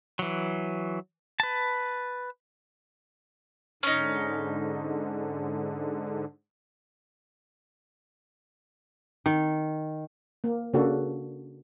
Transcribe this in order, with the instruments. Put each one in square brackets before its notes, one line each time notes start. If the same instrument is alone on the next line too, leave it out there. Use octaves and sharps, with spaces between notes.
[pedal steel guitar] E3 F#3
B4 A5
[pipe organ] G#2 D3 [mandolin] C#4 D#4
[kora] D#3
[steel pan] A#3
C#3 A#3 D4 F#4 A4